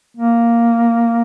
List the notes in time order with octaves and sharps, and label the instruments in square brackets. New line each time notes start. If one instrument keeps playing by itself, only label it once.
[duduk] A#3